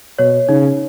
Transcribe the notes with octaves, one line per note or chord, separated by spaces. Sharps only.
B2 C#5
C#3 D#4